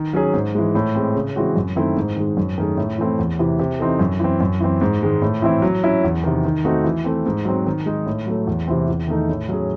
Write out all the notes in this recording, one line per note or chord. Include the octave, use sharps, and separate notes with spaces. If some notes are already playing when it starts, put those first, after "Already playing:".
Already playing: D#3
F#3 C#4 G#4
G#2
E3 G#3
A2
G#3 C4
C#3
E3 G#3 C4 F#4
F#2
D#3 A3 C4 E4
G#2
D#3 G#3
F#2
D#3 A3 C#4 G#4
A2
E3 A3 C4 E4
E2
C3 E3
C3
E3 C4 D#4 A4
F#2
E3 C4
F#2
E3 C4
G#2
D#3 G#3
A2
E3 C4 E4
F#3
C#4 E4
E2
C3 D#3
D#3
A3 C4 D#4 F#4
E3
A3 C4
G#2
F#3 C4
D#3
G#3 D#4 G#4
A2
F#3 A3
E2
C3 E3 C4
E2
D#3 A3 D#4
A2
F#3 C#4 G#4